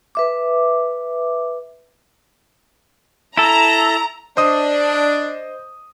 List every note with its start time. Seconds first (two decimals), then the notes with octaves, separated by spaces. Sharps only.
0.15 B4 E5 D6
3.37 E4 A4 A#5
4.37 D4 C5 D#5 D#6